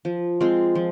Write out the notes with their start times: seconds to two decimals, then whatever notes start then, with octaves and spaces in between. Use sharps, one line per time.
0.05 F3
0.41 G#3 C4 F4
0.75 F3